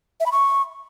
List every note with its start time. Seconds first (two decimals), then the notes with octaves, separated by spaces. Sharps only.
0.20 E5
0.26 B5
0.32 C#6